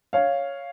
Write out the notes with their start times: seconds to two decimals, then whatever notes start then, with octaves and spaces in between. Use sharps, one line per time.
0.13 C#5 F5